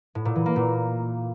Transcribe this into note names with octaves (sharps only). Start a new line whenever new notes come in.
A2
A#2
E3
A#3
A#2